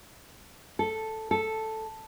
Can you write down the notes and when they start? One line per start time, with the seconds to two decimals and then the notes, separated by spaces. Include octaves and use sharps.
0.79 A4
1.31 A4